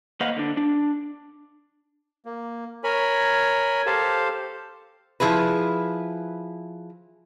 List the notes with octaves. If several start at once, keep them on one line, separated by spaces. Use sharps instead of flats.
A#3 B4 C5 D#5 F5 F#5
D3 D4
D4
A#3
A#4 C#5 G#5 B5
G4 A4 C5 F5 A5
F3 E4 G#4 B4